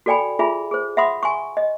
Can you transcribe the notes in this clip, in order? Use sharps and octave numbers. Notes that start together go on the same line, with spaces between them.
F#4 A4 D5 G5 G#5 B5
F4 G#4 E5 G#5 B5
G#4 C5
E5 F#5 B5 C6 D#6
G#5 C6 C#6
D#5